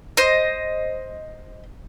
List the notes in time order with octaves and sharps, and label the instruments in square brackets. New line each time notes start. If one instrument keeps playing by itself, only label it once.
[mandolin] C5 D#5